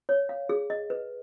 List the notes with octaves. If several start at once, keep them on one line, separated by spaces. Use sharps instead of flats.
C#5
F5
G#4
D#5
B4